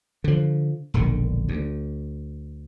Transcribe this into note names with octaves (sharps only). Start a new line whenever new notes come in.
D3 F3
E1 A#1 D3 D#3
D2